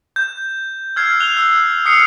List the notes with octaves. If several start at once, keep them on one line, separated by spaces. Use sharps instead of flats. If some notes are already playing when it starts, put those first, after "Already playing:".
G6
E6 F6 G#6 C7
F#6 F7 G7
E6
D#6 F6 C7 C#7